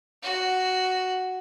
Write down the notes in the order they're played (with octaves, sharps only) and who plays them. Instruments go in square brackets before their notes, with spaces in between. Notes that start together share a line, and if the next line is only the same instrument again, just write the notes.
[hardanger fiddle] F#4